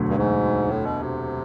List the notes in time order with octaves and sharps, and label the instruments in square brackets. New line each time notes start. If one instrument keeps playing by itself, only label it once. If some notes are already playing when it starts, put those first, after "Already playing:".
Already playing: [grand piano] E1 D2 D3 F#3 A3
[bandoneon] G2
G#2
A2
B2
C3